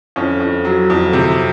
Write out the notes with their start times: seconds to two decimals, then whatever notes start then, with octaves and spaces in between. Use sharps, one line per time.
0.16 F2 C#4
0.40 F2
0.65 F#3
0.90 F2
1.13 C3